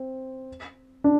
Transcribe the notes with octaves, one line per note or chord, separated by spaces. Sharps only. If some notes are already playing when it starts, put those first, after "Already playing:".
Already playing: C4
D4